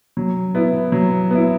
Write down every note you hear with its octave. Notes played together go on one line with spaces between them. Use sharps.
F#3
B3 E4
F#3
B3 E4